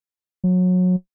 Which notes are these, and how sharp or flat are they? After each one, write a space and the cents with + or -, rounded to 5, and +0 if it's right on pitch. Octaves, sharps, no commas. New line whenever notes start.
F#3 -25